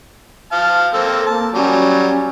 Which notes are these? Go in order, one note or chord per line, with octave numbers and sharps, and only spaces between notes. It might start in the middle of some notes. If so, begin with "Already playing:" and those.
F5 A5
A#3 C4 A4
A#3 A5
F#3 G3 C#4